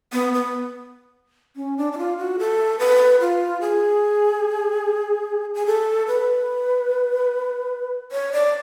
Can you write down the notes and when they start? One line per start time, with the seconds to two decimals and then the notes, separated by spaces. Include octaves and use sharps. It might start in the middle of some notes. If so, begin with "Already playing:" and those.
0.13 B3
0.33 B3
1.56 C#4
1.77 D4
1.93 D4
1.98 F4
2.18 F#4
2.39 A4
2.79 B4
3.21 F4
3.61 G#4
5.54 G#4
5.66 A4
6.07 B4
8.12 C#5
8.32 D5